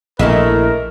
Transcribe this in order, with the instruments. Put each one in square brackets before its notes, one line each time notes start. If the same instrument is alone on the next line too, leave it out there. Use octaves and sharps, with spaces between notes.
[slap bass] A#1 [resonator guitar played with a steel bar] E3 G#4 D#5 [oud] A3 E4 E5 [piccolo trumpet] A#4